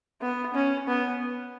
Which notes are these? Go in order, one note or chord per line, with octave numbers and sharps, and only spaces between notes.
B3
C#4
B3